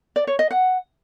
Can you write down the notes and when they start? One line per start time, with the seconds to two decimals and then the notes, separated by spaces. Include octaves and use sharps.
0.16 D5
0.27 C#5
0.39 D#5
0.51 F#5